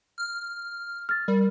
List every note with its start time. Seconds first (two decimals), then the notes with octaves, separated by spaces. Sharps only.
0.18 F6
1.09 F6 A6
1.28 G3 A#4